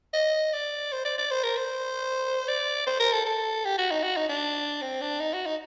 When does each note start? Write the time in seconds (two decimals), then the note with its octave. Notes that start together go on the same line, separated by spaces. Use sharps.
0.14 D#5
0.53 D5
0.92 C5
1.05 D5
1.18 D5
1.31 C5
1.44 A#4
1.57 C5
2.48 D5
2.87 C5
3.00 A#4
3.13 A4
3.25 A4
3.65 G4
3.78 F#4
3.91 D#4
4.03 F#4
4.16 D#4
4.29 D4
4.82 C4
5.01 D4
5.20 D#4
5.34 F#4
5.46 D#4